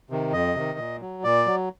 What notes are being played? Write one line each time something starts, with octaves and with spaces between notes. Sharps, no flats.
C3 D#3
F2 D#5
C3 D#3
A#2
F#3
A#2 D5
F#3